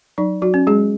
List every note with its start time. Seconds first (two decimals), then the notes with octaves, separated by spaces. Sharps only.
0.18 F#3 D#4
0.42 F#3 F#4
0.54 C#4
0.67 G#3 G#4